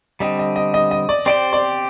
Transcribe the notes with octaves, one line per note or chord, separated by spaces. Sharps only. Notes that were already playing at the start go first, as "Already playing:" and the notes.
D3 G3 C4 D#5
D#5
D#5
D#5
D#5
D5
C4 G4 C5 D5
D5